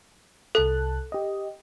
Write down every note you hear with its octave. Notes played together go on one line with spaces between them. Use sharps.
C2 A4 A5 F#6
G4 D#5